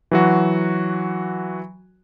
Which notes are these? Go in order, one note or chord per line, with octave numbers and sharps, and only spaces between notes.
E3 F#3 F#4